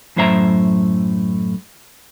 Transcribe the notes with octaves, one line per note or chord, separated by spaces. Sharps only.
F#2 A2 F#3 C5 E5 A#5